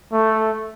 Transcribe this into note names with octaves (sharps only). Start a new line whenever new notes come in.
A3